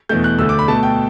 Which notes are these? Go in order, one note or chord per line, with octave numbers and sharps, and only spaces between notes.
E2 B2 A3 G6
F#6
D2 D3 A3 E6
D6
B5
B2 A3 A5
G5